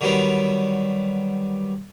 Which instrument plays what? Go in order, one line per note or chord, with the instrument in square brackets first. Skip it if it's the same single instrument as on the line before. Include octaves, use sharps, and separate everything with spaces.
[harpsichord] D3 D#3 F#3 G3 B3 D4